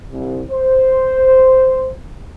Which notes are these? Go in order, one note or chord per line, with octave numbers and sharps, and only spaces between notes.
C2
C5